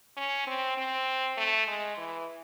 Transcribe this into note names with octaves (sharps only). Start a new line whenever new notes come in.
C#4
C4
C4
A3
G#3
E3